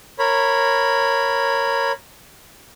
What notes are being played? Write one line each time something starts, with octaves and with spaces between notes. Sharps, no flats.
A#4 C#5 B5